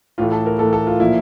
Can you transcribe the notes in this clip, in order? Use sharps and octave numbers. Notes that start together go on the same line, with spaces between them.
A2 E3 A3 F4
A4
A#4
A2 E3 A3 A4
A4
F4
A#2 F3 A#3 E4